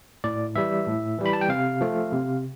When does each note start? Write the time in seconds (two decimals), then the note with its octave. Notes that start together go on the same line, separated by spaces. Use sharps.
0.24 A2 D5
0.56 E3 G3 E5
0.87 A2
1.18 E3 G3
1.26 B5
1.33 A5
1.41 G5
1.49 C3 F5
1.81 F3 A3
2.12 C3